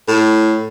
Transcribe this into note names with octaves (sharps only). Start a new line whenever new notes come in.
A2